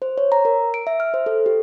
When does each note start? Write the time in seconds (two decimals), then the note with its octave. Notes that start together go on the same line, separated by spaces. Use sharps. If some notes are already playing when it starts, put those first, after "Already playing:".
0.02 C5
0.18 C#5
0.32 A#5
0.45 A#4
0.74 D7
0.87 E5
1.00 F6
1.14 C5
1.26 A4
1.46 G4